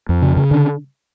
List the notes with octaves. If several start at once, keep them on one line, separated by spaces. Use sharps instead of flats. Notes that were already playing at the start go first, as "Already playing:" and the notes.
F2
C#3
C#3
D3